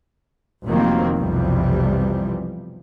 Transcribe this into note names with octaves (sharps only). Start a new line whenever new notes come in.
F1 D#3 F#3 A#3 C4
B1 F2 C3 E3 G3